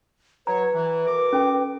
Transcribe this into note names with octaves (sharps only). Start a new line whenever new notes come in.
F#3 B4 C#5 A#5
E3
B2 A#4 D6
C#4 A4 G5